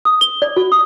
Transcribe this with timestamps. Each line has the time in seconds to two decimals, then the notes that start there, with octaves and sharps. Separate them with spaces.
0.05 D#6
0.21 G7
0.42 D5
0.56 F#4
0.72 D#6